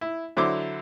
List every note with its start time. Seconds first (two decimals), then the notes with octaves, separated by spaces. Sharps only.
0.01 E4
0.37 D3 F#3 E4 C5 D6